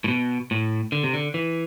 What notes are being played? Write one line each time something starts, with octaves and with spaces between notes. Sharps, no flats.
A2
B2
A2
D3
C3
D3
E3